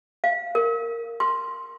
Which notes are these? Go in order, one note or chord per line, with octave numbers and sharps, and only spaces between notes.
F5
A#4
C6